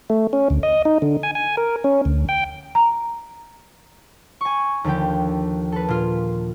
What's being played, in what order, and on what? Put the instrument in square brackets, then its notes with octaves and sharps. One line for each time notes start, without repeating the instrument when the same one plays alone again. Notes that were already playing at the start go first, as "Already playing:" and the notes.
[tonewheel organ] A3
C#4
D2
D#5
D#4
D3
G#5
G#5
A#4
C#4
D2
G5
[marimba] A#5
[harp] G#5 C#6
D#2 D3 F3 G4 G5
A4 B4
A#2 F4